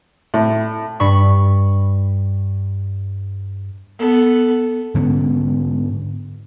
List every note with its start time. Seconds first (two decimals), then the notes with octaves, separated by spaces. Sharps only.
0.34 A2
1.00 G2 B5 C#6
3.99 B3 A4
4.95 G#2 D3 B3 C#4